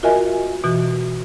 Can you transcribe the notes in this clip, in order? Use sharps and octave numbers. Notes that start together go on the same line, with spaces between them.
F4 F#4 A#4 D#5 E5 G#5
B2 E3 F#4